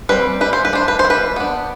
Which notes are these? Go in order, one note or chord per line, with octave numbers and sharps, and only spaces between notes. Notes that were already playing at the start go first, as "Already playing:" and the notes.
G3 C4 B4
G3 B4
C5
B4
D4 C5
B4
C5
G3
B4
B3 D4